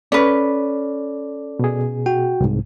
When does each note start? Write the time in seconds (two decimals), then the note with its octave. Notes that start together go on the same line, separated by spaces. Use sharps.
0.12 C#4 A4 B4 D5
1.59 B2 G#4
2.06 F#4 G5
2.41 C2 G#2